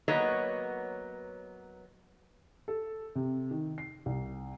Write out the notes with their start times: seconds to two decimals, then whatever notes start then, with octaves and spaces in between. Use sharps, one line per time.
0.08 F#3 A#3 B3 C#5 D#5
2.68 A4
3.15 C3
3.51 D#3
3.78 C7
4.06 C2